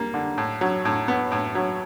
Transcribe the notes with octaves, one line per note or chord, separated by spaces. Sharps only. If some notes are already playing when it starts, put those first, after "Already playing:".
Already playing: G3 A#3
D3
A2
F#3
A2
B3
A2
F#3